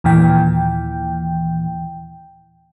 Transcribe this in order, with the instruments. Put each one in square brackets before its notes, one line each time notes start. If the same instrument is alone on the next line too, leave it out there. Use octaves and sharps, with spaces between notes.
[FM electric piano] D#2 A#2 E3 G5